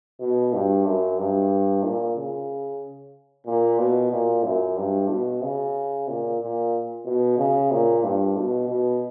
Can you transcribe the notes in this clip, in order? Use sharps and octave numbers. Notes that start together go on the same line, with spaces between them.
B2
G2
F#2
G2
A#2
C#3
A#2
B2
A#2
F#2
G2
B2
C#3
A#2
A#2
B2
C#3
A#2
G2
B2
B2